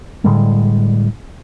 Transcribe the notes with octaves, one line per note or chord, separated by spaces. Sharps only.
A2 D3 G3 G#3